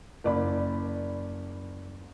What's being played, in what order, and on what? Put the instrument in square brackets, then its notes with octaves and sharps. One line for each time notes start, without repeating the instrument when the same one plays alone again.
[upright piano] F#1 D5 B5